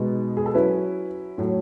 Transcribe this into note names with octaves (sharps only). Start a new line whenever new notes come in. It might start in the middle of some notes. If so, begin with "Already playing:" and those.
Already playing: B2 G#3 B3 D#4
G#4
A4
F#3 C#4 E4 B4
A2 F#3 A3